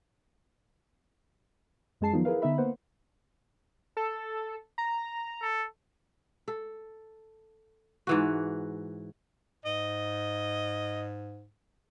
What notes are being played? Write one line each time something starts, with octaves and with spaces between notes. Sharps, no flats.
F#2 G#3 G#4 A5 C7
D#3 F3 F#3 B3 D#4 F4
E4 G#4 A#4 B4 F5
D3 B3 D#4 E5 B5
A#3 B3 B4 C5 F#5
A4
A#5
A4
A4
G#2 E3 F#4
G#2 D#5